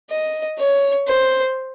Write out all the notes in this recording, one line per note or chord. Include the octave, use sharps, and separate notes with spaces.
D#5
C#5
C5